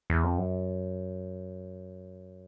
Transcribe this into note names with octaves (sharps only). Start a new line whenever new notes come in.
E2
F2
F#2